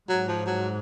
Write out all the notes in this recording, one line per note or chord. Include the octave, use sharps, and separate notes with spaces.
G#2 F#3
F3
F#3